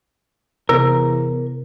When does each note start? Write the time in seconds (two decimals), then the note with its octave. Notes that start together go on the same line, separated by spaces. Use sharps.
0.69 E2 C3 A#4